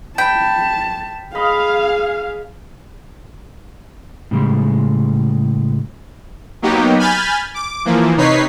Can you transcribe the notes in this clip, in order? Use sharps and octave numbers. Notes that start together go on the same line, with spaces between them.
G5 A5 B5
G#4 D#5 F5 B5
A2 C#3 G3 G#3
F#3 A#3 B3 D#4 G4
G#5 B5 F6 G6 A6
D6
E3 F3 A#3
C3 D#4 B4 C#5 B6 C7